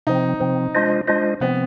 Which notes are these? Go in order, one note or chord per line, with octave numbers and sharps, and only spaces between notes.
C3 F3 C4 D#4
C3 F3 C4
G#3 D4 F4 C5 D#5
G#3 D4 F4 C5 D#5
C3 F3 B3 C4